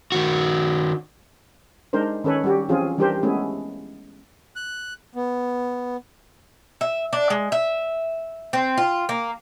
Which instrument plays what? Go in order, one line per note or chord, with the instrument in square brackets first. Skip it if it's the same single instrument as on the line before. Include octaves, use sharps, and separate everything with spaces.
[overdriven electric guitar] D#3 F#4
[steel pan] G#3 D4 D#4 A#4 C5
D#3 C#4 A4 B4 C#5
G3 F#4 G4
E3 F3 C4 C#4 F4 G#4
E3 G3 D4 G4 A#4 C5
G#3 A3 B3 C#4 E4 G#4
[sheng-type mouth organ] F#6
B3
[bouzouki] E5
D4
G#3
E5
C4
F4
A#3